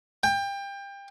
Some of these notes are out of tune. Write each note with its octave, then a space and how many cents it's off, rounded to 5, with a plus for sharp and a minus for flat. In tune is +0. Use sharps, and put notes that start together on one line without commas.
G5 +25